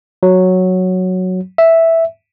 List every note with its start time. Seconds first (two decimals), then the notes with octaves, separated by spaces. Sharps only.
0.23 F#3
1.58 E5